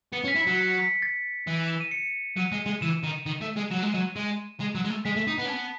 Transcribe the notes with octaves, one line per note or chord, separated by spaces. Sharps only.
B3 C#7
C#4
B6
E4
F#3 C#7
C#7
C#7
B6
A6
E3
E7
D#7
C#7
F#3 D#7
G#3
G#3
E3 E7
D#3 D#7
D#3
A3
G#3
F#3 E7
G#3
F#3 D#7
G#3
G#3
F#3
G#3
A3
G#3 B6
A3 B6
D#4
B3 B5
C#4
B3 A5